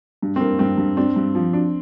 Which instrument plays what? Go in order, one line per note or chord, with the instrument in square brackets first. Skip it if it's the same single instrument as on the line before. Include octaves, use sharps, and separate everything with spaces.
[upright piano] G2
[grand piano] C4
[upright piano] G2 [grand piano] A#3
[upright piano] G2 [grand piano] C4
[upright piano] G2
[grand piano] C4 [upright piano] D4
[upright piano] G2
F3
D4